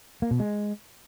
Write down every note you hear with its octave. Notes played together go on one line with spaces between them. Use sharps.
A#3
B2
G#3